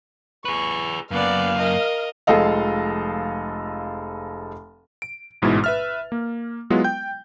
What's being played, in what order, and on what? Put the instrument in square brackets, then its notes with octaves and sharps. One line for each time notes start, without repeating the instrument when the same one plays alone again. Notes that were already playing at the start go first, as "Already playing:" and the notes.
[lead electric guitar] G#4 B4 [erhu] C#6
[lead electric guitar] F#2 A#3 [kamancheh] B3 D5 [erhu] F5
[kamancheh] A#4 D#5
[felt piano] F1 F3 G#3 A4 D#5 F5
[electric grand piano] D7
A1 G#2 B2 G#3 E4 A6
B4 E5 F6
A#3
F#3 G#3 B3 E4 F4
G5 G6